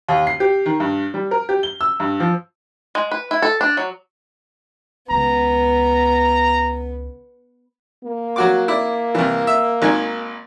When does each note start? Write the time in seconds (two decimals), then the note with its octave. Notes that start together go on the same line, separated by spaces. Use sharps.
0.08 D#2
0.27 C7
0.40 G4
0.66 D#3
0.80 G2
1.14 G3
1.31 A#4
1.49 G4
1.63 G7
1.81 E6
2.00 G2
2.20 F3
2.95 G#3
3.11 B4
3.31 E4
3.42 A4
3.61 D4
3.77 F#3
5.10 C#2 D#3 B3 A#5
8.04 A#3
8.36 F#3 F#4 D6
8.68 E4 D5
9.15 C2 E3
9.47 E5
9.82 G#1 D#3 G#5